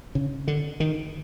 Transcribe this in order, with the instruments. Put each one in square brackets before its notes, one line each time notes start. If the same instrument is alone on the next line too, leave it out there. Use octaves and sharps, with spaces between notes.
[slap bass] C#3
D3
D#3